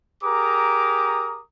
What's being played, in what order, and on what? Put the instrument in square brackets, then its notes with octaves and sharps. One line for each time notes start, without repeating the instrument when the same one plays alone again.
[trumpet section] G4 G#4 A#4 A#5 D6 D#6